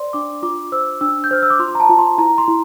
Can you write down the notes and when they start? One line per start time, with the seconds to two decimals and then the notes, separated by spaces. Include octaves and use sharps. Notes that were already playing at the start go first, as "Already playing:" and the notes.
Already playing: C5 D5 C6
0.13 D4 D6
0.43 F4 D6
0.72 C5 E6
1.01 D4 E6
1.24 G6
1.31 C5 F6
1.42 E6
1.50 D6
1.59 F4 C6
1.75 A#5
1.80 A5
1.89 F4
1.99 C6
2.18 E4 A#5
2.38 C6
2.48 E4